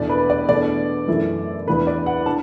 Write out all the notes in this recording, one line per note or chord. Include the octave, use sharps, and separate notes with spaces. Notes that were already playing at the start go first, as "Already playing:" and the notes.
Already playing: E2 B2 A3 D4 D5
B4
D5
E2 B2 A3 D4 D5
F#2 E3 A3 E4
E2 E3 D4 B4
D5
F#5
D4 A5